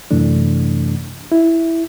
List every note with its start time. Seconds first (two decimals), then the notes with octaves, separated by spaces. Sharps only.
0.11 F#2 C3 E3 A3 D4
1.32 E4